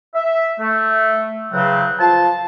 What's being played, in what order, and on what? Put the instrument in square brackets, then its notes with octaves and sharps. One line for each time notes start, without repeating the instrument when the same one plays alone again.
[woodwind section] E5
A3
E2 C#3 F#3 C4 F#5
F3 F4 A5